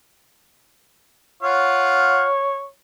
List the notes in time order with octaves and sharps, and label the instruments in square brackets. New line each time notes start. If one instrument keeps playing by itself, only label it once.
[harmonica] F4 F5 F#5 [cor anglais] C#5